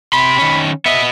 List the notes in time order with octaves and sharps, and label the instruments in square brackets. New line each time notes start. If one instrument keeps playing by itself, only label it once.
[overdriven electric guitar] C3 C6 [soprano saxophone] B5
[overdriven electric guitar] D#3 C#4
[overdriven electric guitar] B3 D#5 [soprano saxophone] E5